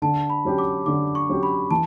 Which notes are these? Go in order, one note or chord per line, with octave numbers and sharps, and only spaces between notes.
D3 A5
B5
F#3 C#4 G4
D6
D3 D6
C#6
F#3 C#4 G4
B5
E3 A5